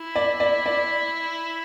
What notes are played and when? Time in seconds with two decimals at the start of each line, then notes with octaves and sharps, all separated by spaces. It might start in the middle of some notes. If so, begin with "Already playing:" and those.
Already playing: E4
0.16 D5
0.40 D5
0.66 D5